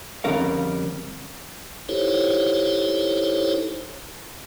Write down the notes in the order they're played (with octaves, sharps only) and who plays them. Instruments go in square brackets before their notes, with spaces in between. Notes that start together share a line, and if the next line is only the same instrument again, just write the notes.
[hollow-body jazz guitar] F2 D3 G3 C#4 A#4 F5
[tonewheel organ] D#4 E4 G4 A4 C5 C#5